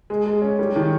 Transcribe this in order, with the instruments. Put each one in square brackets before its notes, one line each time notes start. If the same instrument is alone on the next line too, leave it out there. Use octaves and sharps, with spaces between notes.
[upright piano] G#3
G#3
C#4
G3
D#3